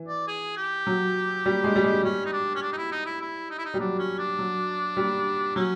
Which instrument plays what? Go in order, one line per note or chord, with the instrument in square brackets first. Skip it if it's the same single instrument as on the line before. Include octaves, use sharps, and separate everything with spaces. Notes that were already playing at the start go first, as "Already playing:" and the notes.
Already playing: [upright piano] E3
[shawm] D5
G#4
G4
[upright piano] F#3
G3
G#3
G3
G#3
[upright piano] G3 [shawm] C#4
[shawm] D#4
D4
C#4
D4
D#4
E4
D#4
E4
E4
D#4
E4
D#4
[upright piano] G3
[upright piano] F#3 [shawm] D4
[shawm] C#4
D4
[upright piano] F#3
G3
[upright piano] F#3 [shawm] C#4